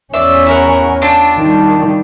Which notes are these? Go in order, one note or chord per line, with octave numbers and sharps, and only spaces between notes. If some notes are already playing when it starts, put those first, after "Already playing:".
E2 C#4 D5 E5
E4 A#4 F#5
C4 D4 F4
D#3 G3